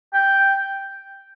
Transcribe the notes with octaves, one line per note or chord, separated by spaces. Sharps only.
G5